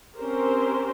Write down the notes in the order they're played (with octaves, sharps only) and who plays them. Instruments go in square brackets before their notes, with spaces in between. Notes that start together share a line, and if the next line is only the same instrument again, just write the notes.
[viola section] C4 C#4 G4 A#4 C5